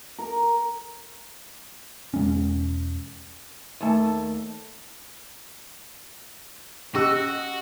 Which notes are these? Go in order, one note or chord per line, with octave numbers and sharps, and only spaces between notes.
A#4
E1 G#3 C#4
D#2 A3 A5
C#4 F#4 G4 D#5 E6